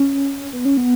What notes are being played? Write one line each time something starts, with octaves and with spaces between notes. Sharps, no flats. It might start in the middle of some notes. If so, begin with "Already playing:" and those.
Already playing: C#4
B3
C#4
B3